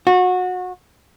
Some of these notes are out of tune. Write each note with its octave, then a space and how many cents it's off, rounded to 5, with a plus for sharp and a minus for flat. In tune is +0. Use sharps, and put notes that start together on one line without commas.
F#4 -25